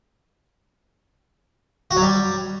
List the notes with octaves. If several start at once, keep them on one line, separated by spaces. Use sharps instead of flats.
F#4
F#3
G3